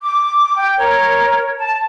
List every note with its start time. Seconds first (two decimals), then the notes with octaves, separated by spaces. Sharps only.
0.02 D6
0.56 G5
0.78 A#4 C#5
1.58 A5